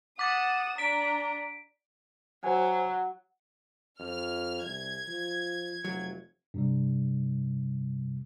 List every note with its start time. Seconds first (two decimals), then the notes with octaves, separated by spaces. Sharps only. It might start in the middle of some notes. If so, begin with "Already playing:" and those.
0.19 F#5 D6 D#6 A6 E7
0.78 D4 A#5 B6 D7
2.44 F#3 C5 G#5
4.00 F2 F6
4.64 C2 G#6
5.08 F3
5.85 F1 F#3
6.54 G2 C3 G3